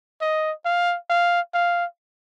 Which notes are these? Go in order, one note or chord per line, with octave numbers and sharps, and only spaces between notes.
D#5
F5
F5
F5